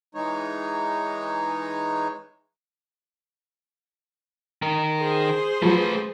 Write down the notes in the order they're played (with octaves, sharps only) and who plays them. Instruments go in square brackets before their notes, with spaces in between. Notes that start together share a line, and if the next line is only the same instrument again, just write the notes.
[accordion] E3 G#3 D#4 C#5
[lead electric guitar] D#3 A#4
[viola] G#4 C5
[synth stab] F3 F#3 [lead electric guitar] A3 B4